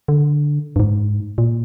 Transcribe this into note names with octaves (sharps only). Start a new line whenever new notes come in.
D3
G2
G#2
A#2